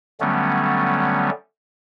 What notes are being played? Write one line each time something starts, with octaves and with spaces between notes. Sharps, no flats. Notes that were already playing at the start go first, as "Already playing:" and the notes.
D3 F#3 G3 A3 B3 C#4